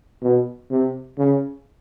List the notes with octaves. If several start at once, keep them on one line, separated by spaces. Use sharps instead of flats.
B2
C3
C#3